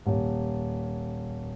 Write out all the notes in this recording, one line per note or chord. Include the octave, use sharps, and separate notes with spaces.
D#1